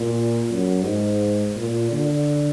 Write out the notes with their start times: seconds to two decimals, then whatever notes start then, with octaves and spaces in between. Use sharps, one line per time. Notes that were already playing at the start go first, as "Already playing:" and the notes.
Already playing: A#2
0.50 F#2
0.84 G#2
1.56 A#2
1.91 D3